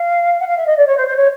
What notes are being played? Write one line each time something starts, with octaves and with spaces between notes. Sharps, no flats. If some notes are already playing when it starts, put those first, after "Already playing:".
Already playing: F5
F#5
F5
E5
D#5
D5
C#5
C5
C5
C#5